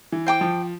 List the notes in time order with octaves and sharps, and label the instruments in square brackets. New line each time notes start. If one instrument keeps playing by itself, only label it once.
[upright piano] E3
[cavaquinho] C5 G5 D6
[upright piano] F3